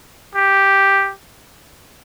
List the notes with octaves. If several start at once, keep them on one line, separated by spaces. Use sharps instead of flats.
G4